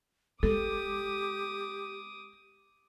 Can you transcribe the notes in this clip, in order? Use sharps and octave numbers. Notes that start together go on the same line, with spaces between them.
G#3 G4 A4 D6 D#6